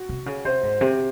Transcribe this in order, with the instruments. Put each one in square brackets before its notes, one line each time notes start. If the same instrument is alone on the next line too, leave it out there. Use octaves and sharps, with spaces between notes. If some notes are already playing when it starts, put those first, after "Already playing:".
Already playing: [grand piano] F#4
[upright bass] C3
C#3
[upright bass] C3 [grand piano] C5
[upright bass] G#2
C3